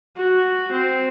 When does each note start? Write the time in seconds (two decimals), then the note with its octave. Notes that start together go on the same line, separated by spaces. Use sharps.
0.18 F#4
0.72 C4